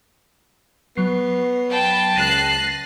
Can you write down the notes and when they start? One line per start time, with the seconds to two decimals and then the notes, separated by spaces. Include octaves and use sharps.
0.97 F#3 B3 C7
1.71 G5 A5 B5
2.16 C#2 F#6 A6 A#6 C7 D#7